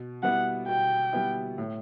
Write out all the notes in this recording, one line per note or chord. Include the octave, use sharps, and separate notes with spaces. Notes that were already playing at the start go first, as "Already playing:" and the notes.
Already playing: B2
G3 B3 E4 F#5
B2 G5
G3 B3 E4
A2